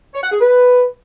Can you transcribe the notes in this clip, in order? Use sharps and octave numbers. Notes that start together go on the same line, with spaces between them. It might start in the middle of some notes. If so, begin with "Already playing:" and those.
C#5
F#5
G#4
B4